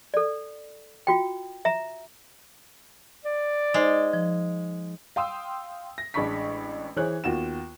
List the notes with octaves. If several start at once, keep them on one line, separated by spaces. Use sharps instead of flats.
A4 D5
F4 F#4 G5
E5 A#5
D5
G#3 D#4 C5
F3
F5 G5 C6 D#6 E6
A#6
A1 G#3 D4 B5 C#6 B6
E3 G#4 C5 C#5 F#6
D#2 B3 F4 F#4 E7